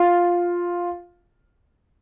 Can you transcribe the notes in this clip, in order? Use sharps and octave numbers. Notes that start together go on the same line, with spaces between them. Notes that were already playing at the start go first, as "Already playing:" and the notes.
Already playing: F4